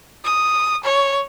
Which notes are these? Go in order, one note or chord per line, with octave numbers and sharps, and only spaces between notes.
D#6
C#5